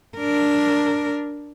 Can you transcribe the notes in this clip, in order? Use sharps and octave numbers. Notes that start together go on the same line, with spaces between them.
D4 A#4